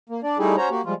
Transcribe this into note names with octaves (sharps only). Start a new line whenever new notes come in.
A#3
D4 D5
G3 A3 D#4 E4 G4 G#4
C#4 F#4 C5 C#5 A#5
A#3 F#4 G4
F3 G3 G#3 F4